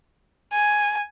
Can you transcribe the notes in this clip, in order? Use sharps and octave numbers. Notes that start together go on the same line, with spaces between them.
G#5